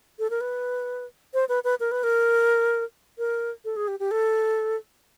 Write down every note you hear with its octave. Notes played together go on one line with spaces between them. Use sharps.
A4
A#4
B4
C5
B4
B4
A#4
B4
A#4
A#4
A4
G#4
G4
G4
A4